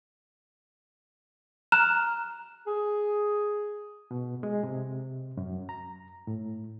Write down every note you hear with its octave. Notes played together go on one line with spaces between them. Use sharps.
A#5 F6 F#6 E7
G#4
B2
G#3
C3
F#2
A#5
A2